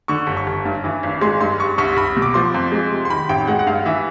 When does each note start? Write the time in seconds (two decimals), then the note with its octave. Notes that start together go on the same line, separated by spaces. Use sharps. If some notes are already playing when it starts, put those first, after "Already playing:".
0.08 D3 C#6
0.27 G1
0.37 C#6
0.47 G1
0.65 G2
0.84 E3
1.03 G#1
1.21 G#3 C6
1.40 G2 C6
1.60 G3 C#6
1.78 C2 C#6
1.97 C2 B5
2.16 B2
2.22 D6
2.34 F3 C6
2.54 F2
2.72 G#3
2.91 C3
3.05 C6
3.10 D#3 B5
3.29 A1 G5
3.47 G#3 F#5
3.59 F#5
3.66 G2 F5
3.85 E3 E5